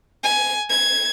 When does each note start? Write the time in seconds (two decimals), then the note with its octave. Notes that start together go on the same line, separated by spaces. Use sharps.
0.24 G#5
0.70 G#6